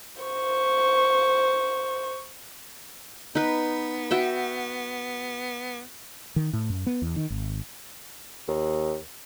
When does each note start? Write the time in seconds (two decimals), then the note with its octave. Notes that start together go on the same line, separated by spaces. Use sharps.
0.22 C5 C#6
3.35 B3 D#4 B4
4.11 F#4 E5 G5
6.36 D#3
6.53 A2
6.70 F#2
6.87 B3
7.02 E2
7.16 D#3
7.30 G#1
8.48 D#2